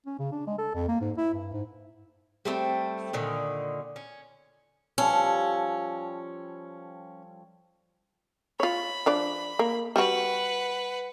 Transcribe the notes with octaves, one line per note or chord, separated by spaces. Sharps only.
C#4
C#3
D4
G#3
A4
F2
A#3
G#2
E4
G2
G#2
G3 A3 C4 G5
A#2 D3 D#3
C#4
F3 G3 C#4 A4
F4 C#5 B5
F3 D4 D5
A#3
G3 F#4 B4 F#5